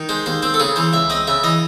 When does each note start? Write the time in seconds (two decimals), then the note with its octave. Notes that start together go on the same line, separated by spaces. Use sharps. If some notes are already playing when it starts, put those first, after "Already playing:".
Already playing: D#3
0.09 G#3 C5
0.26 D#2 C5
0.43 C4 C5
0.54 A4
0.60 C#3 G#4
0.76 E3 C5
0.93 C#2 E5
1.10 C4 D#5
1.27 C#3 E5
1.44 E3 D#5